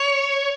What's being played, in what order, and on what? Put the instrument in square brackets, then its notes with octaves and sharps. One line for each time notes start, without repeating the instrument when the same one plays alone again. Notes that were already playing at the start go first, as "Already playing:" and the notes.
Already playing: [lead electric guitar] C#5